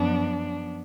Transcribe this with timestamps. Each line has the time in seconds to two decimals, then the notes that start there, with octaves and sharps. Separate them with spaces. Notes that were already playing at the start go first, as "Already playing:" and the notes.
Already playing: F#2 F3 B3 D4